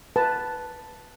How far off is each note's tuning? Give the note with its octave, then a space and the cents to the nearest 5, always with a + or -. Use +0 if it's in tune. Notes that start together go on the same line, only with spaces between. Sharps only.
B4 +0 A5 +0